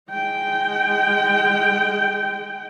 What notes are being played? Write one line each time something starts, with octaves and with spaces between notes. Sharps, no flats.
G#3 G5